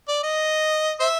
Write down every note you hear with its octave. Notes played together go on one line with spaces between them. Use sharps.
D5
D#5
C5 E5